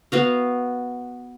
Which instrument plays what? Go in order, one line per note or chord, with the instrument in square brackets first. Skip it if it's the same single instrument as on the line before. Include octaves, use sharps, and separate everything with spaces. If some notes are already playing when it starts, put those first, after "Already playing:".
[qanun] B3 F#4 F5